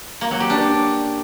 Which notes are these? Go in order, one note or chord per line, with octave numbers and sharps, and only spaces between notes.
A#3
F#3
G4
D4